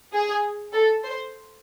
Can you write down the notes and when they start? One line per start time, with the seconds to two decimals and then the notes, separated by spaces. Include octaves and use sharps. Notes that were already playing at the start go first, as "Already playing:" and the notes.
0.13 G#4
0.73 A4
1.04 C5